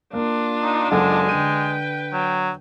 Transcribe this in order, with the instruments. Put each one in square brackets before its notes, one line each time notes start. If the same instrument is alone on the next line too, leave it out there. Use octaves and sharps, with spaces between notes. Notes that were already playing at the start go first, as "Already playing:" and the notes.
[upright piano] A#3 [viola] D4 F4
[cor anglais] D#4
[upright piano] F#1 A4 F#5 [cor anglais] G#3
[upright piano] D3 D#7 [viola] B4 G5
[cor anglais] F#3